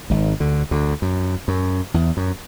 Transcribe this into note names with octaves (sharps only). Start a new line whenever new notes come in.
G#1 G#2
D2 D3
D2 D3
F#2
F#2
E2
F#2